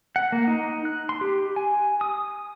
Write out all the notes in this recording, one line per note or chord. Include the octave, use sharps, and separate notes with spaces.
F#5
A#3
D#4
F#6
C6
G4
G#5
D#6